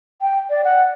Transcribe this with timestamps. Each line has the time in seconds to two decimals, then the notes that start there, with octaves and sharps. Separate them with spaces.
0.21 G5
0.50 D5
0.64 F#5